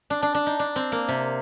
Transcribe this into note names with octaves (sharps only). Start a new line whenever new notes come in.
D4
D4
D4
D#4
D4
C4
A#3
C3